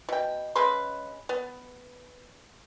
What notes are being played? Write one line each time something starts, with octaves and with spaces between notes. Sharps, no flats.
B2 G5
C#3 G#3 B4 C6
B3